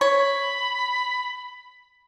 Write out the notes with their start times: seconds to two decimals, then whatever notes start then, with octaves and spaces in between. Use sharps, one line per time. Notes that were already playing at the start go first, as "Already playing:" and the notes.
0.01 C#5 B5